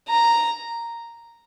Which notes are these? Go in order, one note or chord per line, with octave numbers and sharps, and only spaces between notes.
A#5